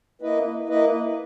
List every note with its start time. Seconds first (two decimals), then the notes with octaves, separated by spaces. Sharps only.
0.22 A#3 E4 B4 D#5
0.69 A#3 E4 B4 D#5